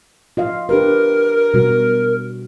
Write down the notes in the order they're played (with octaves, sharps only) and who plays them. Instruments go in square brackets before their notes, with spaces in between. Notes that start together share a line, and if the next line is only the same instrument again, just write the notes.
[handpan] F4 D#5 F5
[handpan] D4 G4 B4 [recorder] A#4
[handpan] B2 G3 F#4